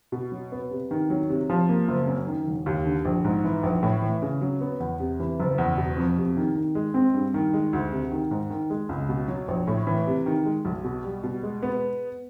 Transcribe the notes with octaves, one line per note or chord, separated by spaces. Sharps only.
B2
F#3
B3
C3
D#3
F#3
C3
F3
A#3
F#1
F#2
D#3
E1
D#2
D3
A#1
G#2
E3
A#1
A2
E3
C#3
F#3
B3
E2
C3
E3
F#1
E2
B2
F2
C3
D#3
D#3
G#3
C4
G2
D#3
G#3
D2
C3
D#3
G#2
D#3
G#3
C#2
B2
F#3
A#1
A2
E3
C3
D#3
G#3
B1
B2
G3
B2
G#3
B3